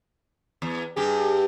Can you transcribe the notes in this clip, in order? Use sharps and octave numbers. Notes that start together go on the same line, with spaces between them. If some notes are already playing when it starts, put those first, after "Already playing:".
E2
G2 G4 G#4